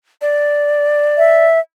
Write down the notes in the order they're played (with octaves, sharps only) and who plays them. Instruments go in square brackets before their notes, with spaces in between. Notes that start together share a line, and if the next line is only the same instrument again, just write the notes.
[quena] D5
[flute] E5